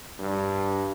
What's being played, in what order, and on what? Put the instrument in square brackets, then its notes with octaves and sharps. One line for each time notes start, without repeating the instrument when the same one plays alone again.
[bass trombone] G2